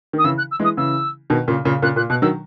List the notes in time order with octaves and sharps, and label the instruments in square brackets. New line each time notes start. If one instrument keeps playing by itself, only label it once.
[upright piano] D#3 [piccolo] D#6
[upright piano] C#3 E3 [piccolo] E6
[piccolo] F#6
E6
[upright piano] E3 G#3
[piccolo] D#6
[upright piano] C#3 E3 [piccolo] E6
[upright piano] B2 D#3
A#2 C#3
A#2 C#3
[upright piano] A#2 C#3 [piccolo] F#6
[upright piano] A#2 [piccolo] F#6
[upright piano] B2 [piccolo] F#6
[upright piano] D#3 F#3 [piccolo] E6